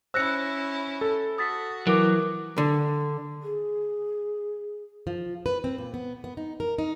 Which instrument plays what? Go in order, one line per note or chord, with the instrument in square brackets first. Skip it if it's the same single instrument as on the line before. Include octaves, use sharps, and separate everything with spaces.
[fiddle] C#4 E4 [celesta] C5 F#6 A#6 [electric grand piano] E6 C#7
[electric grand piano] A4
[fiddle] F#4 [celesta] D#6 A6 B6
[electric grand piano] E3 D7 [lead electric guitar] F#3 [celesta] A#4 D6
[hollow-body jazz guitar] D3
[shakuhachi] G#4
[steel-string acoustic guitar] F3
B4
C4
A#2
B3
B3
D#4
A#4
D#4